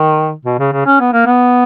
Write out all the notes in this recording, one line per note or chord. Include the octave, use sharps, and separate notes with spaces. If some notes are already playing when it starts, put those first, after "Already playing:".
Already playing: D#3
B2
C#3
C#3
C#4
B3
A#3
B3